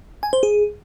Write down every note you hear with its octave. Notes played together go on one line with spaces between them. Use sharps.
G#5
C5
G#4